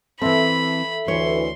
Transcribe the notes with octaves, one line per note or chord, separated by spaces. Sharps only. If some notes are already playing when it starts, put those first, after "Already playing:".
E3 C4 A4 E5 B5
D2 E3 C#5 C6